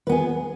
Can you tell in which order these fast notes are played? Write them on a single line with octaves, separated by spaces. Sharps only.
B4 B3 G#4